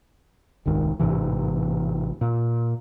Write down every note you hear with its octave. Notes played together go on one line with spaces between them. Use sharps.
D#1 C2 G#2 D#3
A1 G#2 C3 E3
A#2